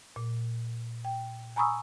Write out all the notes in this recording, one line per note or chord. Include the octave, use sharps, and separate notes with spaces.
A#2
G5
G#5 A#5 B5 C#6 D#6 E6